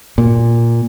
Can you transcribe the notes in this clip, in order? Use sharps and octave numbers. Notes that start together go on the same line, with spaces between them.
A#2